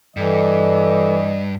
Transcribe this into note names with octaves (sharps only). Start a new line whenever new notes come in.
G2 E3 A4 D5 D#5